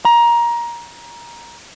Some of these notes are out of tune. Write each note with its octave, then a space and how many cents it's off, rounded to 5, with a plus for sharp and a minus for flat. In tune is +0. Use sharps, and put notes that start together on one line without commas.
A#5 +20